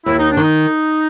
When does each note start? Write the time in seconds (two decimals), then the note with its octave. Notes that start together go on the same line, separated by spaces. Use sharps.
0.06 D#2 E4
0.18 D#4
0.31 D4
0.37 D#3
0.43 D#4